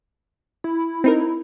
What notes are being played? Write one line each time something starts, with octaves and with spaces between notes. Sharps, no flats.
E4
C4 D#4 A#4